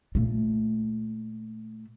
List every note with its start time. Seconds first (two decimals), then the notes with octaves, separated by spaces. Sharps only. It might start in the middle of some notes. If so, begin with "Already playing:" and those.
0.15 A#2 A3